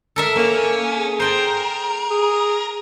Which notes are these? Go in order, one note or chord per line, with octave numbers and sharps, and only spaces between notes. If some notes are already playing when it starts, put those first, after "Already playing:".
A4 A#4 E5
A#3 C#4
G#4
A#4 C5 G5 A5
G#4